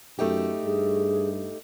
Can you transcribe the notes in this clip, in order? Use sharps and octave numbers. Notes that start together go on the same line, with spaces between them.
F#2 A3 D#4 G4
G2 G#4